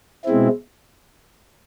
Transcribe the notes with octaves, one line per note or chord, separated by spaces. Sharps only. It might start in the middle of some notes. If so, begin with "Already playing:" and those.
B2 G#3 C4 E4